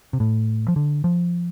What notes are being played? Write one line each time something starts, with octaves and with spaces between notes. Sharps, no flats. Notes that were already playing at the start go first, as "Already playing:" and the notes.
C3
A2
F3
D3
F3